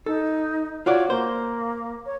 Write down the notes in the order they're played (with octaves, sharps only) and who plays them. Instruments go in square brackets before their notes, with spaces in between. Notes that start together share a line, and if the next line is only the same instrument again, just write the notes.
[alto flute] D#4 [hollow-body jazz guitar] A4
[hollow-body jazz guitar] F4 F#4 D5 [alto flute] C#5
[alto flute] A#3 [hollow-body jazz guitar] C5
[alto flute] C#5